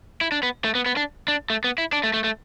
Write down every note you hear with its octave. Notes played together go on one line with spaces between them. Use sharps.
E4
D4
B3
A3
B3
B3
D4
D4
A3
B3
E4
D4
A3
A3
A3